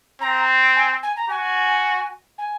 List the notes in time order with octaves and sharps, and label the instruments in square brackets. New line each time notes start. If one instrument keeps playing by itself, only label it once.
[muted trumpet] C4 [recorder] A#5
[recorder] G#5
G#5
A#5
[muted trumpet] F#4 [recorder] G#5
[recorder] G#5